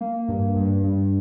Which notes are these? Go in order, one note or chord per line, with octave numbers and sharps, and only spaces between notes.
A#3
G2
G2
G2